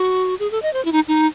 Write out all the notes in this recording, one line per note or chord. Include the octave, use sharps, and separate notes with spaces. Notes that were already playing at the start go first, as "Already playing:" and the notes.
Already playing: F#4
G#4
A4
D#5
C5
E4
D#4
D#4